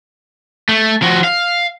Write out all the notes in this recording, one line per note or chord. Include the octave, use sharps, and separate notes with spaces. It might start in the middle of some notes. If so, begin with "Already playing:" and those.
A3
F3 F#4
F5